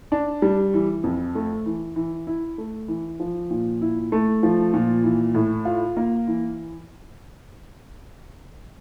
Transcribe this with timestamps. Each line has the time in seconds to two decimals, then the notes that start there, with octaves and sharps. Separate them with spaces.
0.12 D4
0.42 G3
0.74 E3
1.04 F2
1.35 A3
1.66 E3
1.96 E3
2.27 E4
2.58 A3
2.88 E3
3.20 F3
3.51 A#2
3.81 E4
4.12 A3
4.43 F3
4.74 A#2
5.04 E3
5.34 A2
5.65 F4
5.97 A#3
6.27 E3